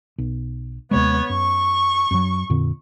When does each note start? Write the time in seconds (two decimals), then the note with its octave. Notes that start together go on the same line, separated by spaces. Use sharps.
0.18 B1
0.91 D#2 C3 G#3 B3 C#5
1.30 F#2 C#6
2.11 F#2 F#3
2.50 F2 A#2 D3